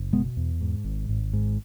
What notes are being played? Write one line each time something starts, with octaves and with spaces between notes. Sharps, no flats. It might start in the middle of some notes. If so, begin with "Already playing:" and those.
Already playing: F#1
B2 G#3 B3
E2
G#2
G#1
G#1
G#2